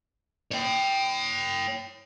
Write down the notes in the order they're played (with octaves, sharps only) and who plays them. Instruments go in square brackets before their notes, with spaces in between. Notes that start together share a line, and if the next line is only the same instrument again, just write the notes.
[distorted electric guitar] C#5 G5